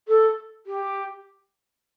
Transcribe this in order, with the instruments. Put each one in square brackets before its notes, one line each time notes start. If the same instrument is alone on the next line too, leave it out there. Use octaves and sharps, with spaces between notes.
[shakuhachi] A4
G4